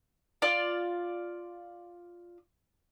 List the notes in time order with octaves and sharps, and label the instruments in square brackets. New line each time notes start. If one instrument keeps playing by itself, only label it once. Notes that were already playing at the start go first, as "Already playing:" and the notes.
[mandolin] F4 D5